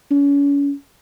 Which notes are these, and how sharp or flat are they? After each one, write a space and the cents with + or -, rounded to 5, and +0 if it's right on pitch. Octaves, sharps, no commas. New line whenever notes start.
C#4 +35